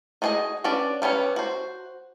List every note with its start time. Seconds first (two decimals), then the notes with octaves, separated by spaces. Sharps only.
0.22 D#4 F#4 G#4 B4 D#5
0.64 C#4 D4 B4 D5
1.02 G3 B3 C#4 C#5
1.36 F#4 C5